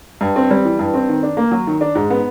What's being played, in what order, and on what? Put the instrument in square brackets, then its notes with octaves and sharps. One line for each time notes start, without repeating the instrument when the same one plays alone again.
[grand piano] G2
C4
G3
E3
G2
C4
D#3
D4
A#3
F#3
D#3
D4
G#2
B3